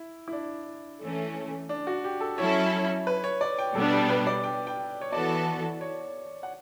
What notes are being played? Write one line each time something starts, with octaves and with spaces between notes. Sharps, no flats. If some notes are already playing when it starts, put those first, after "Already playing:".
Already playing: E4
E4
D4
E3 A3 C#4
D4
F#4
G4
A4
F#3 C#4 E4 A4 C#5
B4
C#5
D5
G5
B2 G3 B3 D4 A4
G4
B4
D5
G5
G5
C#5
E3 B3 F#4 A4 D5
C#5
F#5